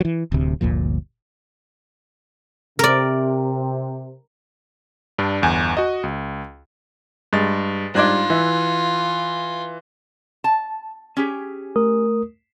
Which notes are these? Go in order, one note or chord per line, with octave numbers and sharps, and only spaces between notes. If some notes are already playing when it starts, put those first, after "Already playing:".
E3 F#3
D1 D2 C3
G1 D2 A#2 F3
C3 A#4 D5
G2 D4
G1 E2 G#5
F#4 D#5
C#2
G2 G#3 A6
G#2 G3 D4 F4 D5 F#6 G#6
E3 E5
A5
C#4 G4 G#4
A3 A#4 D#6